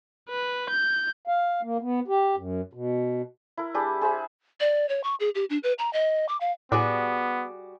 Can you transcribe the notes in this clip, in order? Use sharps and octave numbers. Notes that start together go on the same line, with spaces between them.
B4
G6
F5
A#3
B3
G4
F#2
B2
E4 A#4
G3 D4 G4 G#4
G#4 C5 E5 B5
D5
C#5
C#6
G#4
G4
D4
B4
A#5
D#5
D6
F5
A2 G3 B3 F#4 G#4 D6